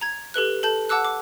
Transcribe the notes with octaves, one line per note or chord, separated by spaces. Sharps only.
A#5 G#6
G4 A4 B4 F#6
A4 A5 G6 F#7
F#5 A5 D6 E6 F#6
D6